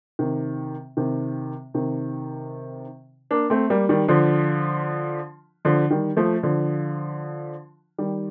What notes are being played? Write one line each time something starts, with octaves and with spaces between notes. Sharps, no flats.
C3 D#3
C3 D#3
C3 D#3
A#3 D4
A3 C4
G3 A#3
D#3 G3
D3 F3
D3 F3
D#3 G3
F3 A3
D3 F3
D#3 G3